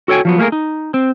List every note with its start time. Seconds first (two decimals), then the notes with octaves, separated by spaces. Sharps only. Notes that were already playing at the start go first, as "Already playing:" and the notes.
0.08 F#4 A4 C#5 G5 G#5
0.25 F3 F#3 B3
0.38 A3 A#3 G4 G#4 A#4
0.52 D#4
0.94 C4